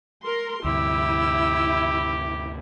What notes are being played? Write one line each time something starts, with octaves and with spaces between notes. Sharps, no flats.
A#4 C6
D2 G2 C3 E4 G4 E6